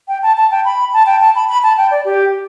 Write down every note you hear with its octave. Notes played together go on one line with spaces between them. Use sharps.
G5
A5
A5
G5
B5
A5
G5
A5
B5
B5
A5
G5
D5
G4